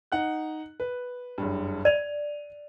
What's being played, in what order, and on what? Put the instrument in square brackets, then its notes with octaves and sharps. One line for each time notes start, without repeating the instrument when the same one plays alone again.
[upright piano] D#4 F#5 F#6
B4
F#1 G2
[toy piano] D5 [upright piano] D#7 F7